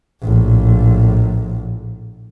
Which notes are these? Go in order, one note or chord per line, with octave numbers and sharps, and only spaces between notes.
A#1 A2